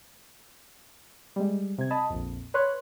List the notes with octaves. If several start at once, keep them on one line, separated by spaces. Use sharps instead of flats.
G3 G#3
C3 G#6
D#5 A5 B5 D#6
A#1 F2
B4 C#5 C6 F#6